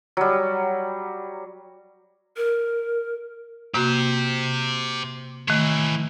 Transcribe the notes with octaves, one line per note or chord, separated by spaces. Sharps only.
F#3 G3
A#4
C3 A#3 F#4 G4 C5
D#3 E3 A3 C#5